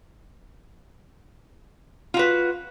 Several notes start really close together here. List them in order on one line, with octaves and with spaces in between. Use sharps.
F4 F#4 B4